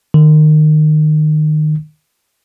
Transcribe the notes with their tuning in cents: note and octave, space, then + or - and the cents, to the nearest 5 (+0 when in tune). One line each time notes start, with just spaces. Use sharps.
D#3 -25